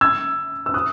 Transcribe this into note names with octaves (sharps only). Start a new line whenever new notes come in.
E6 G#6
E6
D#6 F#6